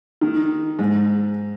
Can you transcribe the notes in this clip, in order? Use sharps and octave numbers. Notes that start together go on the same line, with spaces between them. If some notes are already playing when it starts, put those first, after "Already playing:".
D#3
G#2